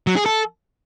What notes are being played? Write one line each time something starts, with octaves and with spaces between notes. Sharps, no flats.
F#3
G#4
A4